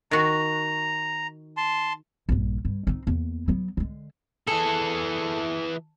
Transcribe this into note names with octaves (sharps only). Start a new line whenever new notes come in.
D#3 F#4 A#5
A5 C6
A#1 G2
G2
C4 D#4
E2 A#3
F#3 B3
D3 G#3
E3 G#4 A4